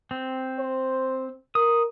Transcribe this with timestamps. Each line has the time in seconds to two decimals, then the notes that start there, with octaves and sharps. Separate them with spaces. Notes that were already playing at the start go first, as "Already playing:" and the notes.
0.11 C4
0.59 C5
1.55 A#4 D#6